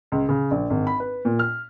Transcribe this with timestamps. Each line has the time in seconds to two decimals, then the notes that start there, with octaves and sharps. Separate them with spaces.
0.12 C#2
0.29 C#3
0.51 A#1
0.70 G#1
0.87 B5
1.00 B4
1.25 A#2
1.39 F6